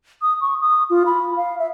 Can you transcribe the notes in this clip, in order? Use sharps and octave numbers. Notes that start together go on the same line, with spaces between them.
D#6
C#6
D#6
F4
B5
F5
E5